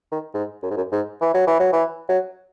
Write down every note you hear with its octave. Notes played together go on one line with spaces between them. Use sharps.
D#3
G#2
F#2
G#2
F#2
G#2
E3
F#3
E3
F#3
E3
F#3